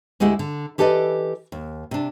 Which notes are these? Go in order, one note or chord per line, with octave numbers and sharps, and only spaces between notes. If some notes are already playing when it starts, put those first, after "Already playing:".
D2 G#3 A3 E4 G4 F#5
D3
E3 G4 A4 B4 D5 D#5
D#2
C3 D4